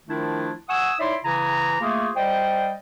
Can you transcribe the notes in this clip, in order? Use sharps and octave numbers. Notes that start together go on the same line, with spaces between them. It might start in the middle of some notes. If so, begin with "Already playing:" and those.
D#3 F3 A3 D4 E4 F4
F#5 G#5 C#6 D#6 E6
D#4 E4 C#5 D5 E5 C6
C#3 E3 E4 G#5 A#5
A3 A#3 F4 G#4
G3 C5 D5 D#5 G5